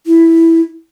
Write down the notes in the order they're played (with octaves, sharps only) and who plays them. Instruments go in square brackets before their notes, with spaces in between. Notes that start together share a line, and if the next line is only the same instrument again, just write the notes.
[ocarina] E4